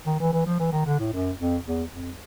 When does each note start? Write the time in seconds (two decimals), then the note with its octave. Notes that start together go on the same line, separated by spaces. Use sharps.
0.06 D#3
0.20 E3
0.33 E3
0.46 F3
0.59 E3
0.72 D#3
0.86 D3
1.00 A2
1.13 F#2
1.38 F2
1.66 E2
1.93 F2